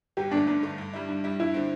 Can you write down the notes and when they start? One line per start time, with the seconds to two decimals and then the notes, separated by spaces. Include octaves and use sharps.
0.17 G1 G4
0.31 G2 D3 A3 D4
0.47 G1 D4
0.63 G2 D3 A3
0.78 G2
0.93 G3 E4
1.09 G2
1.24 G3 E4
1.40 G2 E4
1.54 D3 C4